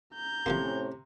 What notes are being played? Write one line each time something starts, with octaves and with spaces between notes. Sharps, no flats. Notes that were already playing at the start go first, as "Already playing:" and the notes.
A#5 G6
A2 C3 F3 G3 A#3 C#4 C5